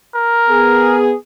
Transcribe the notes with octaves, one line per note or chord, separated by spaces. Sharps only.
A#4
B3 G#4